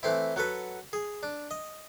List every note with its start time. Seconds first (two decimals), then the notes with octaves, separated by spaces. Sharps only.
0.03 E3 A3 C4 E4
0.36 F#3 F#4 A4 B4
0.93 G#4
1.23 D4
1.51 D#5